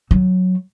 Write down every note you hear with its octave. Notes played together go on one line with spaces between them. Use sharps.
F#3